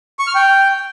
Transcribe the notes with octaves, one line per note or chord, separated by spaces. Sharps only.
C#6
F6
G5